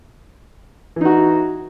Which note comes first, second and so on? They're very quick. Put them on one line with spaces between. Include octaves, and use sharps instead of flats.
E3 D#4 F#4